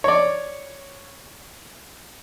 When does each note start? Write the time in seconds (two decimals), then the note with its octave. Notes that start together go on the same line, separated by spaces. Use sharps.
0.04 C#5 D5